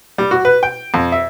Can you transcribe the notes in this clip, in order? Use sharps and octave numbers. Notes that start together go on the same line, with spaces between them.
G3
F#4
B4
G5
F2
E5